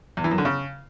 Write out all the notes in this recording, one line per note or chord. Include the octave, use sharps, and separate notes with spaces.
E2
E3
F#2
D3
C#3